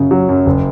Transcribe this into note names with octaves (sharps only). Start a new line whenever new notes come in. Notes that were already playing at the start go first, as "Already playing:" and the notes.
Already playing: F#2 C#3
F#3
F#2
F#1